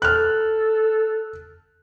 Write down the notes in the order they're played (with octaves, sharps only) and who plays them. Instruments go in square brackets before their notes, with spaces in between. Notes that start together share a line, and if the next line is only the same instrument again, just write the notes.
[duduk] A4 [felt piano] F6 F#6